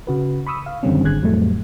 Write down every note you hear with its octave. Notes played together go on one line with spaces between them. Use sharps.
C#3 F#4 B4
B5 C#6 D#6 E6
F5
F#2 D3 D#3 G3 C4 C#4
G#1 D3 G#4 F#6 G#6
F2 A2 F#3 G3 A3